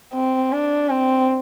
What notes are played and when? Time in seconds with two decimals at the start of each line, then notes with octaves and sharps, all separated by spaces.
0.14 C4
0.52 D4
0.90 C4